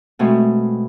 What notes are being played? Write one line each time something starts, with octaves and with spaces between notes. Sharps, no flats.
B2 G#3 A3 C4